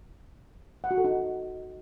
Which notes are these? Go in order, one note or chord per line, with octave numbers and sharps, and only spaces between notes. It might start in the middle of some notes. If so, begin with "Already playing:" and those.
F#5
F#4
A4
D#4